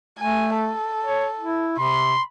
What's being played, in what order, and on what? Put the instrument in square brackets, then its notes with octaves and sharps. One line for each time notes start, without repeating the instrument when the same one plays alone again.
[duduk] A3 [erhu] G#5
[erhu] A4
[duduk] C#5
E4
[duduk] C3 [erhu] B5 [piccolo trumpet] C6